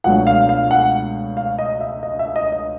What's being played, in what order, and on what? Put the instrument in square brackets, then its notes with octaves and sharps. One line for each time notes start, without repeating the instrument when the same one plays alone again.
[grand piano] C#2 B2 F#3 A3 D4 F#5
F5
F5
F#5
F5
D#5
E5
D#5
E5
D#5
D#5